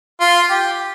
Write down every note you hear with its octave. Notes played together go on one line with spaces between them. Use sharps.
F4
G4